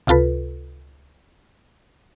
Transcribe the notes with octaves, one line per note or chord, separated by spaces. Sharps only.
C#2 C3 F4 A4 B4